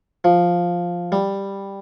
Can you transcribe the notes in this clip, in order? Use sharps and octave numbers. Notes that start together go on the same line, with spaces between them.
F3
G3